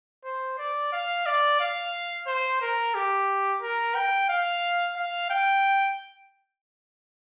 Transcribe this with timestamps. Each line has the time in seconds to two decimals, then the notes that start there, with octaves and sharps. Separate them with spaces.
0.25 C5
0.58 D5
0.92 F5
1.26 D5
1.60 F5
2.27 C5
2.61 A#4
2.94 G4
3.62 A#4
3.95 G5
4.29 F5
4.96 F5
5.30 G5